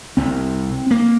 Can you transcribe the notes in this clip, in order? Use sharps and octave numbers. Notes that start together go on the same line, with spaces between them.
C2 C3 C4
A#3